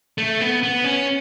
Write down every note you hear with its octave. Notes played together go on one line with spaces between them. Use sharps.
A3
B3
B3
C#4